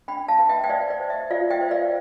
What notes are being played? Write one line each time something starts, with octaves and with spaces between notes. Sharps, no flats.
D4 G5 B5
F5 A5
B4
E5 G5
G5
C5 D5 F5
D5
C5
E5
F4 D5 F5
E5 G5
C5
D5 F5